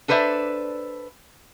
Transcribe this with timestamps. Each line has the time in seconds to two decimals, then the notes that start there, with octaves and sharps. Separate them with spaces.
0.08 D4 A4 B4 C5 D5 E5